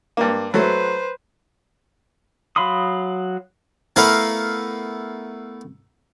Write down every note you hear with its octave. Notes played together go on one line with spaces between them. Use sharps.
G2 A#3
F#3 A3 B4 C5
F#3 F5 B5 C6 D#6
A3 B3 E4 A#4 B4 F5